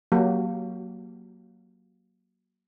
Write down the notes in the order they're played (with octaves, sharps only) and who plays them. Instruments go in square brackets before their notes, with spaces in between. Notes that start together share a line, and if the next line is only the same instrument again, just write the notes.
[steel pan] F#3 A#3 F#4 G4